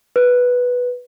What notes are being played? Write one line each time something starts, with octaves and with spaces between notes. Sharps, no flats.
B4